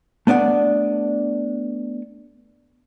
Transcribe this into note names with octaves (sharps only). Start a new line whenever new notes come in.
A3 B3 D4 D5 F#5